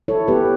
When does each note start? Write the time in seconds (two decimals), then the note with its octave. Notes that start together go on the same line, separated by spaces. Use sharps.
0.08 E4 A4 C#5
0.28 B3 G4 B4